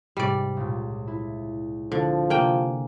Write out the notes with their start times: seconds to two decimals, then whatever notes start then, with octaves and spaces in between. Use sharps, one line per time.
0.17 G#2 C3 G3 D5
0.57 C#2 A#2
1.08 E4
1.92 D3 F3
2.30 C3 A#3 G5 G#5